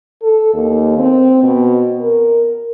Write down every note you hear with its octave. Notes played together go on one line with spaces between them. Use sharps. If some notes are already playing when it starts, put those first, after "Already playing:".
A4
D#2
C4
B2
A#4